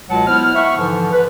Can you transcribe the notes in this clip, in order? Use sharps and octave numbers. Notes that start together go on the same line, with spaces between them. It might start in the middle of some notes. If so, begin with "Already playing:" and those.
C#2 B2 F#3 G#3 F#5 A5
B3 E4 C5 F6
E5 F#5 C#6
G#2 D3 E3 F3
B4